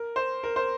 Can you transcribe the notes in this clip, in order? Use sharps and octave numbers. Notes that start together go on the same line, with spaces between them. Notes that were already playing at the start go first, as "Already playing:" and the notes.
Already playing: A#4
C5
A#4
C5